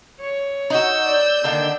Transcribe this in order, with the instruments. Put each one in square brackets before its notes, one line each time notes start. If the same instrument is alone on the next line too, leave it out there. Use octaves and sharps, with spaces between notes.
[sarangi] C#5
[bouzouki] D#4 F#4 [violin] E6 G6
[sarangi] D5
[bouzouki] D3 D#3 A#3 [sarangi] D4